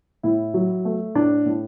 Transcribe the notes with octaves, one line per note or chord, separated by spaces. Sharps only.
A2 E4
F#3
A3
A2 D4
A2